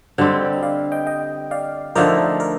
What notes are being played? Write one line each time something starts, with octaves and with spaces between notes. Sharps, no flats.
D3 G3 C4 G4 C5 D#5
D#5
D5 F5
D#5 G5
D#5 G5
D5 F5
D3 F3 A3 D#4 A#4 D5
A#4 D5